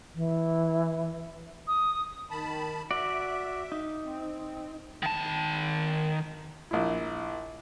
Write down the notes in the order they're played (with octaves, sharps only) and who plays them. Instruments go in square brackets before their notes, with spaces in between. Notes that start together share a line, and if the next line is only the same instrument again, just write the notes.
[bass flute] E3
[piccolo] D#6
[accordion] D#3 A5 B5
[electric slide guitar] F#4 D5 [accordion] E5
[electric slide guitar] D#4
[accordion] C4
[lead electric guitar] D#3 A5
[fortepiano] A#1 E4